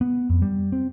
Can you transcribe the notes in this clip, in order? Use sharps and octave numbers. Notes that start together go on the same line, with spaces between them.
B3
F2
G3
C4